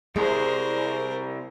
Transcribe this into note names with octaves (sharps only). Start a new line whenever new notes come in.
C2 G#3 A#4 C5